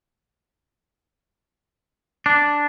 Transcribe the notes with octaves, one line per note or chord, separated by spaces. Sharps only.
D4